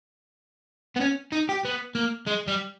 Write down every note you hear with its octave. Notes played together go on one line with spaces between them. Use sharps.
B3
C#4
D#4
G4
B3
A#3
G#3
G3